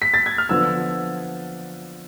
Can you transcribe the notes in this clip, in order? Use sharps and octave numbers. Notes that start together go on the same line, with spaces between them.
B6
A6
G#6
F6
D3 F3 B3 E6